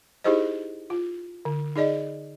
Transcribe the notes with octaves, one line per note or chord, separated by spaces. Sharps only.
D#4 E4 G4 G#4 C5 D#5
F4
D3
D#4 G#4 D5 D#5